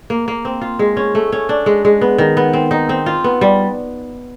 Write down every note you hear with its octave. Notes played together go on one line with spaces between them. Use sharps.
A#3
A#3
C4
F4
G#3
C#4
A3
C#4
D4
G#3
G#3
B3
D#3
B3
C4
D#4
C4
F4
B3
G3